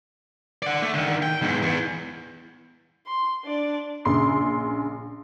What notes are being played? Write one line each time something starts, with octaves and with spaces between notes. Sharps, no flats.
D5 F#5
A3
D3 D#3
G5
E2 G#2
E2
C6
D4 D5
A#1 C#3 C6 C7